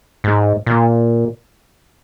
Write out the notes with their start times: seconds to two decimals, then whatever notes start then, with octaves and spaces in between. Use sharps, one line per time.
0.24 G#2
0.66 A#2